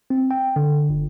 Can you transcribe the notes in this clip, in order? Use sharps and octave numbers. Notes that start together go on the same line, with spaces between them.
C4
G5
D3
G1